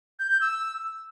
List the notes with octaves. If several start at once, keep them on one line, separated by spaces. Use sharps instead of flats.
G6
G6
E6